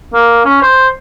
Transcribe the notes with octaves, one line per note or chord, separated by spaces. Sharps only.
A#3
C#4
C5